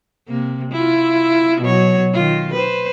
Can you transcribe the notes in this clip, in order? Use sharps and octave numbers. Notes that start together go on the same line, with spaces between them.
C3 A#3
E4 F4
B2 F#3 C#5
D#3 F4
B4 C5